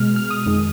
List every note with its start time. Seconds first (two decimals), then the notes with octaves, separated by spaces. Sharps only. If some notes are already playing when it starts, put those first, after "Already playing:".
Already playing: B2 G#3 F6
0.16 F6
0.31 D#6
0.46 F2 D#3 G#3